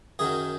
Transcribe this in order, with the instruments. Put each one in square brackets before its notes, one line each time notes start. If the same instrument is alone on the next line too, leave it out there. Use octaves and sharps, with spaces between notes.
[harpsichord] F#2 D#3 F#3 G#4